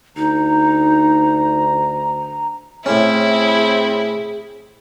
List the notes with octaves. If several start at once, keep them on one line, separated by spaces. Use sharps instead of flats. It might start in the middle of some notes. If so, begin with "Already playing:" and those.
D2 D#4 A#5
A2 C4 C#4 E4 G#4